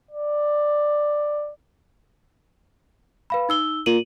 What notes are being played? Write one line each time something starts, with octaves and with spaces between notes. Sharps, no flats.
D5
B4 F5 B5
D#4 E6 G7
A#2 D#7 F#7